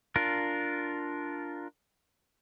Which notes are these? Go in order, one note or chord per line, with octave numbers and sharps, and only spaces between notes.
D4 F4 A#4